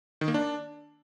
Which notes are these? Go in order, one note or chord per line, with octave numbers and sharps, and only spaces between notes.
D#3
A#3
D4